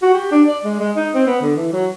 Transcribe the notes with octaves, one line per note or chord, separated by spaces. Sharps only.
F#4
G4
D4
D5
G#3
G#3
D#4
C4
B3
D3
E3
F#3